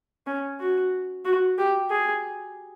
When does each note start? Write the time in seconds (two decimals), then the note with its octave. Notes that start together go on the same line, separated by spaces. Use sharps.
0.27 C#4
0.60 F#4
1.25 F#4
1.58 G4
1.91 G#4